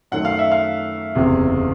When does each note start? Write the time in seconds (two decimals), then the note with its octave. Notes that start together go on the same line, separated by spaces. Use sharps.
0.12 F#2 D#3 F#3 A3 F#5
0.25 F5
0.39 E5
0.52 F5
1.15 F#1 E2 C3